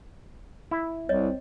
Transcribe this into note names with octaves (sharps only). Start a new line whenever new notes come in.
E4 E5
C2 C4 C#5 D#5